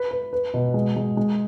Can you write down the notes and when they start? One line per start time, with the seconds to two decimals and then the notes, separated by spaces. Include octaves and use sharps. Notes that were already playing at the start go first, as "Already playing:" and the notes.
Already playing: B4
0.11 B4
0.33 B4
0.54 B2
0.74 G#3
0.96 G#3
1.17 G#3